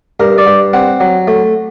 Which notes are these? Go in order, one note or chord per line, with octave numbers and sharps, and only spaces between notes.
G2 A#4
D5
G2
C4 F#5
F#3
A3